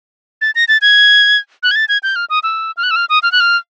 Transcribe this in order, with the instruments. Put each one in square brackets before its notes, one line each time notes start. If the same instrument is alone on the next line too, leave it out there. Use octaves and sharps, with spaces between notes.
[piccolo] A6
A#6
A6
G#6
F#6
G#6
A6
G#6
G6
F6
D#6
E6
F6
F#6
E6
F6
D#6
F6
F#6
F6